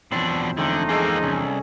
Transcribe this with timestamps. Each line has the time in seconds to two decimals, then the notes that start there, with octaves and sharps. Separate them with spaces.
0.12 E2 B2 F3 F#3 C4 D4
0.57 D3 G#3 A3 C4 D4 D#4
0.89 A#3 C4 G#4 A4 D#5
1.23 C2 C#4